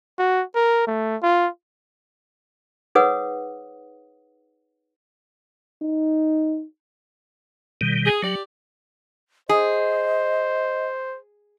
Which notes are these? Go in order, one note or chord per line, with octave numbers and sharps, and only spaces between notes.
F#4
A#4
A3
F4
D#4 G#4 B4 C#5 F#5 D#6
D#4
B2 D#3 G3
G#4
F#3 G4 D5
G#4 C5 D#5